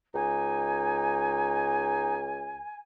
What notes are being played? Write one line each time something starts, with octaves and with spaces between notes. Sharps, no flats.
C#2 D#4 G#5